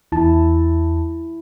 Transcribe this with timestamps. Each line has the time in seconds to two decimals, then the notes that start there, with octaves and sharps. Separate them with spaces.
0.12 E2 E4 A5